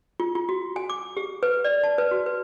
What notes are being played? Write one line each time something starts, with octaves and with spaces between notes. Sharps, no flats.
F4
F4
F#4
G#5
D6
G4
B4
D5
A5
B4
F#4
B4